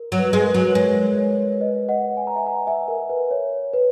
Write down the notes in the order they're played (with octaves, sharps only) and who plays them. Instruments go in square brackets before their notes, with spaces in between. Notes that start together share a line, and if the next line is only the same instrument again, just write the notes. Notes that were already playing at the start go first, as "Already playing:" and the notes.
Already playing: [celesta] A#4
[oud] F#3
[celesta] B4
[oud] G#3
[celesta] A#4
B4
[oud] F#3
[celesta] B4
[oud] G#3 [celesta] C#5
[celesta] C#5
B4 D#5
D#5 F#5
G#5
A#5
E5 G#5
F#5 A#5
E5 G#5
A#4
B4
C#5
B4